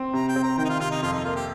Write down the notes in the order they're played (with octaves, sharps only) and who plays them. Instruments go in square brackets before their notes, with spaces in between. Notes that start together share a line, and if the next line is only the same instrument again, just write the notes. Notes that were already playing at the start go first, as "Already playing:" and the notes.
Already playing: [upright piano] C4
[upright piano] C3 [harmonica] A#5
[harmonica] G5
[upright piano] C4
[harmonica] A#5
[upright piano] D#3 [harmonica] G5
[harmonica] D#4
F4
[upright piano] C3 [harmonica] F4
[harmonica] D#4
[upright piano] F2 [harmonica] F4
[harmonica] D#4
[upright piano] A#3 [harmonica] F4
[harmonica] G4